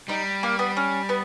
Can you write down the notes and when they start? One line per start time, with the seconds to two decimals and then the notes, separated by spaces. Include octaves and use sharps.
0.08 G3 D#4
0.43 A#3
0.59 B3
0.77 C#4
1.09 B3